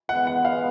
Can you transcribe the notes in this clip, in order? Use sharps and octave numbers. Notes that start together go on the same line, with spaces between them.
E3 G#3 B3 F#5
F#5
F5